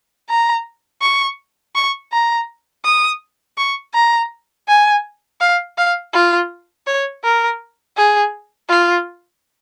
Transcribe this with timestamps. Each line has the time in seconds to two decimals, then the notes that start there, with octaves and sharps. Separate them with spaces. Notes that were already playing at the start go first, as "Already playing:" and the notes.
0.29 A#5
1.02 C#6
1.75 C#6
2.12 A#5
2.85 D#6
3.58 C#6
3.94 A#5
4.68 G#5
5.41 F5
5.78 F5
6.13 F4
6.87 C#5
7.24 A#4
7.97 G#4
8.69 F4